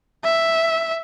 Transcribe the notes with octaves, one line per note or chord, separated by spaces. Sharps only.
E5